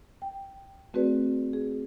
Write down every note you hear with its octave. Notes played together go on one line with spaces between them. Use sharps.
G5
A3 C4 F#4 G#4 B4 D5
G#4